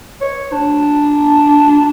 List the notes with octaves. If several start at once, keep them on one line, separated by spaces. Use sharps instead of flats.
C#5
D4